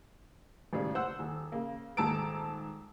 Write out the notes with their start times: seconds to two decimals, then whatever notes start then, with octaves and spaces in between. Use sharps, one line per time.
0.73 G#1 A2 C#3 G3 G#4
0.95 C5 F#5 E6
1.19 D#1
1.52 C#3 A#3
1.97 D#1 G#2 A5 A#5 E6 D7